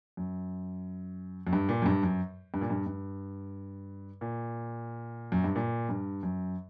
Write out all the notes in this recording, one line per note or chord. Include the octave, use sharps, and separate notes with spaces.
F#2
F#2
G2
A#2
F#2
G2
F#2
G2
A#2
G2
G2
A#2
F#2
G2
A#2
G2
F#2